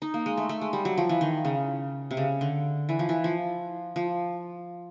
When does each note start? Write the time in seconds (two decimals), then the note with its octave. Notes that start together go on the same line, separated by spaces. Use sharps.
0.02 D#4
0.14 A#3
0.26 G#3
0.37 A3
0.49 A3
0.61 G#3
0.73 G3
0.85 F#3
0.98 F3
1.09 E3
1.21 D#3
1.45 C#3
2.11 C3
2.17 C#3
2.41 D3
2.89 E3
2.99 F3
3.09 E3
3.24 F3
3.96 F3